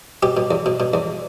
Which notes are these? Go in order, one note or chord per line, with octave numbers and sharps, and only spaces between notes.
B2 G4
B2
E2
B2
B2
E2